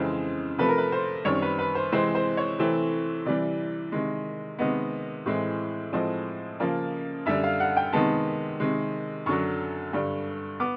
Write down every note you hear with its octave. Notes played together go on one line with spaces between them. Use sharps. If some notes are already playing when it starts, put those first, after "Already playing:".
Already playing: F2 C#3 E3 G#3 C4
C3 F3 A3 B4
A#4
B4
C5
F#2 D#3 G3 C4 C#5
B4
B4
C5
C3 E3 G#3 C4 C5
C5
C#5
C3 E3 A3 C4
C3 E3 G3 D5
C3 D#3 G#3
C3 D#3 G#3 B3 D#5
A2 E3 G#3 C4
A2 F3 G#3 C4 D#5
C#3 F3 A#3
F#2 D3 G3 E5
F5
F#5
G5
C3 D#3 G#3 B3 A5
C3 D#3 G#3
F#2 D3 F#3 C#6
G2 D3 G3
B3 D6